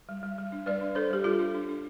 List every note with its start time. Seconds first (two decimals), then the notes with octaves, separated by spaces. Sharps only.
0.09 G3
0.23 G3
0.38 G3
0.52 D4
0.66 G3 B4 D5
0.81 D4
0.95 D4 A4 C5
1.10 G3 G4
1.24 G3 F4 A4
1.39 D4
1.54 D4
1.69 D4